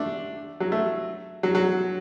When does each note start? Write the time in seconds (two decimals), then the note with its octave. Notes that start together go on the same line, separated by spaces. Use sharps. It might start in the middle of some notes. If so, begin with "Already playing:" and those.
Already playing: A3 D4
0.60 F#3
0.72 A3
1.43 F#3
1.55 F#3